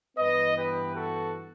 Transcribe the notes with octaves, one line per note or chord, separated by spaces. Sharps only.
G2 E3 B3 B4 D#5
G4 B4
F#4 A4